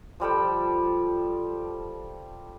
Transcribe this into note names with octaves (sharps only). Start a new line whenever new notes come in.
F3 G3 A4 G5